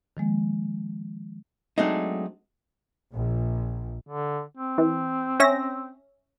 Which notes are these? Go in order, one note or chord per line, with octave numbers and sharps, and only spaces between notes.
D#3 F3 G#3 A#3
F#3 G#3 A3 C4 D4 D#4
A#1
D3
C4
E3
C#4 E5 A#6